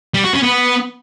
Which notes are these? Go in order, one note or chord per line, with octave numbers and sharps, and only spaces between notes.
G3
F#4
C#4
B3